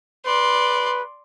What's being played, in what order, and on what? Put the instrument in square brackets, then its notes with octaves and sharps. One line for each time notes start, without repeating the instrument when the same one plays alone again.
[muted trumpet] B4 [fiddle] D5 C6